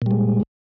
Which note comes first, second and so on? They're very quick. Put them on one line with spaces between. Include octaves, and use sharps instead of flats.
A#2 G3 G#3